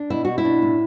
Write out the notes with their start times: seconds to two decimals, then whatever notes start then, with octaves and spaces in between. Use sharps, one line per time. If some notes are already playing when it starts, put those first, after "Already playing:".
Already playing: D4
0.10 B2 E4
0.25 B2 F#4
0.38 E4
0.45 D4
0.62 A2